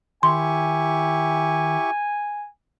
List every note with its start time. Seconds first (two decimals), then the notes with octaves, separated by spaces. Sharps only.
0.23 D#3 E4 G4 G#5 C6 C#6